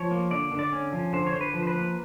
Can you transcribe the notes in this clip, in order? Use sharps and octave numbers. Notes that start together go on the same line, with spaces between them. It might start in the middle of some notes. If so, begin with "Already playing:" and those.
Already playing: F3 C#5
A#3
D3 D5
D3
D5
C#4
F3
D3 C5
C#5
D3 C5
B4
F3
C5
B4
A#3